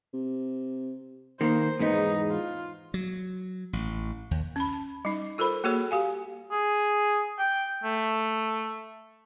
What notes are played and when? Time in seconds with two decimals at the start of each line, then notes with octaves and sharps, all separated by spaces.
0.14 C3
1.41 D#3 A#3 C5
1.79 E2 G#2 B3 D#4
2.30 F4
2.94 F#3
3.73 A1
4.31 D#2
4.56 C#4 B5
4.73 A5
5.05 G3 D#4
5.38 F4 A4 A#4 C5 B5
5.64 A#3 F#4 G#4 A4 C#5
5.91 G4 F5 G#5
6.51 G#4
7.39 G5
7.84 A3